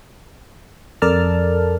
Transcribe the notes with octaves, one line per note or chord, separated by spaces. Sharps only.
F2 A4 A#4 D5 A5 F6